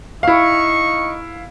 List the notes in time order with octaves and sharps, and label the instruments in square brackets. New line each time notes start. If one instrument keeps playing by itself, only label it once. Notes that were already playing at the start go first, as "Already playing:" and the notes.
[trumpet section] D#4 C#6 [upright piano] E4 F5